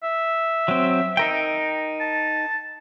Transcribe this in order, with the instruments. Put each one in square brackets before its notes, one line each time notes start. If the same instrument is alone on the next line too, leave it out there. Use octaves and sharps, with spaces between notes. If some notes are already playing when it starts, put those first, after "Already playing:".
[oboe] E5
[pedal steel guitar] F#3 C4
D#4 A#4 G5
[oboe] A5